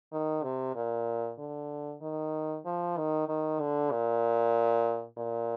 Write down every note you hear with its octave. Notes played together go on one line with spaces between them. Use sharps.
D#3
C3
A#2
D3
D#3
F3
D#3
D#3
D3
A#2
A#2